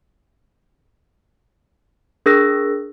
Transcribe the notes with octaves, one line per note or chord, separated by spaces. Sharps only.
D4 G#4 A#4 E6 F#6 A#6